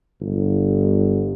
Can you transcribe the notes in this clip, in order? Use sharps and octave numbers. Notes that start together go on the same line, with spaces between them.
G1